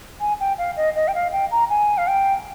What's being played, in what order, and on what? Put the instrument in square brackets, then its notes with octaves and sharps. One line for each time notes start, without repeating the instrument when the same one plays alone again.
[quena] G#5
G5
F5
D#5
D#5
G5
F5
G5
A#5
G#5
F5
G5